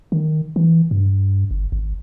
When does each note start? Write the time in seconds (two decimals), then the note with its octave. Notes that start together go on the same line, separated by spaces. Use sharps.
0.12 D#3
0.56 E3
0.91 G2
1.51 G1
1.72 G#1